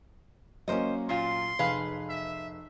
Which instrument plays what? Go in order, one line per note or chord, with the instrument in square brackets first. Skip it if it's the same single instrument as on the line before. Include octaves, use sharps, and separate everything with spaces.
[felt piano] F#3 A#3 C#4 [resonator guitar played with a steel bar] C5 D#5
[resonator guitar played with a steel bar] A#2 F4 [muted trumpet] C6
[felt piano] F1 [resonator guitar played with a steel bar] G#4 B4 F5
[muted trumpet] E5